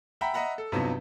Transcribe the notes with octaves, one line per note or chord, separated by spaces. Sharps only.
E5 F#5 G5 A#5 B5
D#5 E5 F#5 A#5 B5
A4
G2 C3 F3 F#3 B3 D#4